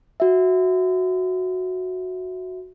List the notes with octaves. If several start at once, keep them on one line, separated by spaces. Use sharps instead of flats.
F#4 E5